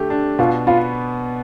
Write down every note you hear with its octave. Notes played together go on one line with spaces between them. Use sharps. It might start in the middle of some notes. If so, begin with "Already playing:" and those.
Already playing: D3 A3 G4
D4
B2 F4
B3 F4